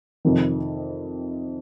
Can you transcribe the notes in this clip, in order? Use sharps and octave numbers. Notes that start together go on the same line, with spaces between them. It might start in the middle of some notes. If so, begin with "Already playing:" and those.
F2 C3 D#3